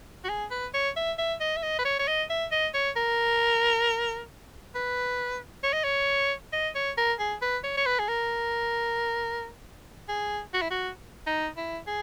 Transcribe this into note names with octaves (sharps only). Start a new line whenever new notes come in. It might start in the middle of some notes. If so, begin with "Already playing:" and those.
F#4
G#4
B4
C#5
E5
E5
D#5
E5
D#5
B4
C#5
C#5
D#5
E5
D#5
C#5
A#4
B4
C#5
D#5
C#5
D#5
C#5
A#4
G#4
B4
C#5
C#5
B4
G#4
A#4
G#4
F#4
E4
F#4
D#4
E4
G#4